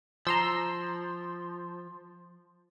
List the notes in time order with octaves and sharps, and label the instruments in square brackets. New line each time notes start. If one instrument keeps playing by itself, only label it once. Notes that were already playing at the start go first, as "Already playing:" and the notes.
[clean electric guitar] F3 [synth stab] A#5 C6 E6